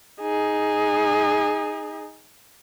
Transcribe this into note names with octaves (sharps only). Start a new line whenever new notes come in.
D#4 G#4